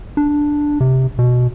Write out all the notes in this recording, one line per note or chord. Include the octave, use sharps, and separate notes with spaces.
D4
C3
B2